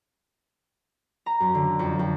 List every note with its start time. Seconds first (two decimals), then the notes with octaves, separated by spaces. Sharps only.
1.26 A#5
1.40 F#2
1.55 D3
1.79 F2
1.99 F2